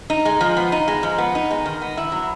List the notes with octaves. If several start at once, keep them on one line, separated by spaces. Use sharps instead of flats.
D#4
G#3
F3
B3
D#4
G#3
F3
B3
D#4
G#3
D#3
B3
E4
F#3